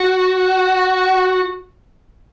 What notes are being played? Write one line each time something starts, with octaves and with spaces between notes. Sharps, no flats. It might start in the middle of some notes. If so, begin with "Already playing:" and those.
Already playing: F#4